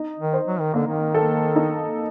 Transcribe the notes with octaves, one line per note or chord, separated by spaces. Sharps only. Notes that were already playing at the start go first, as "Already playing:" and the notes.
Already playing: D#4
D#3
C5
F#3
D#3
D3 A#3
D#3
A4
D#4